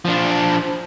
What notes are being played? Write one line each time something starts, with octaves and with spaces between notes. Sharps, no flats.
F3 D4